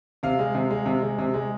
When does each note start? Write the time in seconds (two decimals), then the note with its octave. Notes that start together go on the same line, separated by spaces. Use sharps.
0.23 C3 F5
0.39 G#3
0.55 C3
0.70 G#3
0.86 C3
1.02 G#3
1.18 C3
1.34 G#3